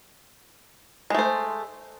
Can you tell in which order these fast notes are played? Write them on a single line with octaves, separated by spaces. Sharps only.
G#3 A3 C5